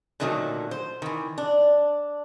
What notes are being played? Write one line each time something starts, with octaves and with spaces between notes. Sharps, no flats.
A#2 D3 D#3 F#3 A3
C5
D#3 E3
D4